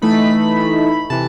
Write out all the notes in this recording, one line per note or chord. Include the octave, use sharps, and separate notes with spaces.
E3 A3 D#4 B5
C3 E3 A5